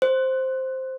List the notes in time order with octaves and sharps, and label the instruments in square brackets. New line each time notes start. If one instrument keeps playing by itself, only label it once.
[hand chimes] C5